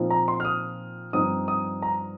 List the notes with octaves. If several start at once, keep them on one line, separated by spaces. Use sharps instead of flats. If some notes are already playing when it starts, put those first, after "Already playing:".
Already playing: A#2 F3 C4 D#4
A#5
C6
F6
D#6
G2 F3 C4 D#4 D#6
D#6
A#5